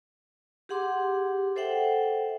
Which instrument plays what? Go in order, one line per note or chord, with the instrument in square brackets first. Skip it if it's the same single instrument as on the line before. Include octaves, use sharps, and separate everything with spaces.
[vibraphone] G4 G#4 F#5 C6 D6
A4 C5 E5 F#5 G5